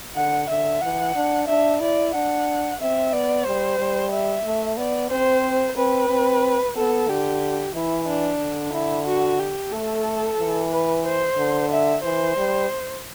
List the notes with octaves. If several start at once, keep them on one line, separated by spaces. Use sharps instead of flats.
D3 F#5
D3 E5
E3 F#5
D4
D4 E5
E4 D5
D4 F#5
C4 E5
B3 D5
G3 C5
G3
E5
A3
B3 D5
C4 C5
C4 B4
C4
B3 A4
D3 G4
E3 E4
D4
D3
E4
F#4
G4
A3 A4
E3
B4
C5
D3
E5
E3 C5
G3